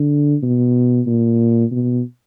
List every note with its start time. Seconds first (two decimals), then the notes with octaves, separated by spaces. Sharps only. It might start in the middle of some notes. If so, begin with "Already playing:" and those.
Already playing: D3
0.43 B2
1.07 A#2
1.72 B2